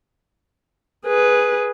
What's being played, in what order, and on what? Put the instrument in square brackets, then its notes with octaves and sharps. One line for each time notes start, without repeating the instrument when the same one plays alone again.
[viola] G#4 B4